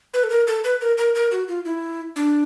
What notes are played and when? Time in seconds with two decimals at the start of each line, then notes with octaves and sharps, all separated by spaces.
0.14 B4
0.23 A4
0.30 A#4
0.47 A4
0.64 B4
0.81 A#4
0.98 A#4
1.15 A#4
1.32 F#4
1.48 F4
1.65 E4
2.16 D4